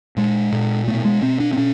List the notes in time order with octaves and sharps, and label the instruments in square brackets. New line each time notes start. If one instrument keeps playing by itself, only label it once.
[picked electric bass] A#2 G#3
A#2
B2 A3
G#3
B2 C4
D4
C4
B2 C#4